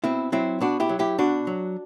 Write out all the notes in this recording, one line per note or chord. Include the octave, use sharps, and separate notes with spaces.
B2 C4 E4
F#3 C4 E4
B2 D4 F#4
E4 G4
F#3
E4 G4
B2 D4 F#4
F#3